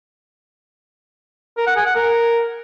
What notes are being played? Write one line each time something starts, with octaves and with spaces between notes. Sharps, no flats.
A#4
F#5
G#4
F#5
A#4